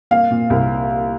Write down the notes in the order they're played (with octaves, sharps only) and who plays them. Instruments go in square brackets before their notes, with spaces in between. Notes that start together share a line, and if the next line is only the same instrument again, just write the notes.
[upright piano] A#3 F5
A#2
C2